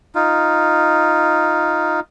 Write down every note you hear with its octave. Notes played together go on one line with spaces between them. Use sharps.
D#4 F4